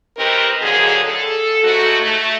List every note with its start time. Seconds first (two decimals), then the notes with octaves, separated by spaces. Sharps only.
0.17 D#3 C4 D#4 G4 A#4 B4
0.62 D#2 D3 F#3 A#3 G#4
1.04 A4
1.64 G#2 A3 F#4
2.01 A3